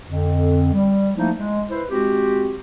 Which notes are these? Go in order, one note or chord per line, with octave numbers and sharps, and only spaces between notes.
F2 D3
G3
F3 A3 A#3 D#4 E4
G#3
E4 B4 C5
G#3 C4 F#4 G4